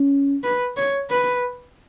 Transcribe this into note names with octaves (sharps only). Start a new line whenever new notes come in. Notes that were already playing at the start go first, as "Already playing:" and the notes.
Already playing: C#4
B4
C#5
B4